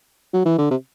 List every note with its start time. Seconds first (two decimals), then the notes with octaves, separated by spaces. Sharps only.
0.34 F#3
0.46 E3
0.59 D3
0.71 C3